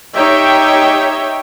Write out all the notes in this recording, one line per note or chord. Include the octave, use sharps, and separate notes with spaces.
D#4 G4 C#5 E5 G5